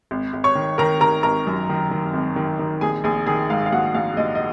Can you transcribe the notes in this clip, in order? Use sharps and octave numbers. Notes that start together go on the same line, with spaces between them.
G#1
G#1
C#5 C#6
D#3
D#3 A#4 A#5
D#3 A#4 A#5
G#1 A#4 A#5
F#2
D#3
D#3
G#1
D#3
D#3
A#1 G#4 G#5
A#1 G#4 G#5
D#3 G#4 G#5
G#2 F5
F5
A#1 F#4 F#5
A#1 F5
A#1 D#5
D#5